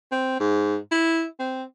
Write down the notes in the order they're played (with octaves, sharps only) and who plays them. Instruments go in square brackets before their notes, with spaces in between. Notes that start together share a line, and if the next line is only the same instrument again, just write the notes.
[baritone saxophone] C4
G#2
E4
C4